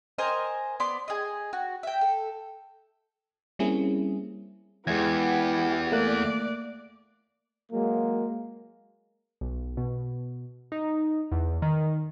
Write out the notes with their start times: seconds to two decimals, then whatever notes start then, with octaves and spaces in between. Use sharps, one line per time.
0.18 A#4 C5 D#5 G#5
0.80 B3 D5 C6
1.08 G#4 D#5
1.53 F#4
1.83 E5 G5
2.01 A4
3.59 G3 A#3 C4 C#4 E4 G#4
4.87 E2 G#3 B3 E4 G4 G#6
5.92 A3 A#3 D5 F#6
7.72 F#3 G#3 A#3
9.41 B1
9.77 B2
10.72 D#4
11.32 E2
11.62 D#3